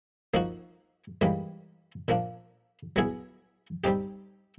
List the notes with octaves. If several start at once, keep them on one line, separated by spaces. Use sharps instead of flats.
F3 A#3 D#4 F#4
G#2 E3 G3 A#3
A#2 F3 A#3 D4
F#3 B3 E4 G#4
G3 C4 D#4 G4